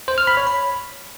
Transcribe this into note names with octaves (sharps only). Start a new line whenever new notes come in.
C5
F6
B5
C#5
B5